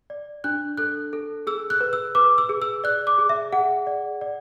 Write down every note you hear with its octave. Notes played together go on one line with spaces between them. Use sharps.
D5
D4 F#6
A4 F#6
A4
G#4 E6
F#6
B4
E6
B4 D6
E6
G#4
E6
D5 F#6
D6
G#4
E5
G#4 F#5
D5
D5